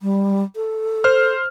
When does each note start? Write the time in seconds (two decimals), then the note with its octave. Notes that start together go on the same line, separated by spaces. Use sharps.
0.02 G3
0.56 A4
1.04 C5 F6